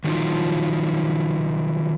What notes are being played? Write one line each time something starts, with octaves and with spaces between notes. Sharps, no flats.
D#3 F3 F#3 D#4 F4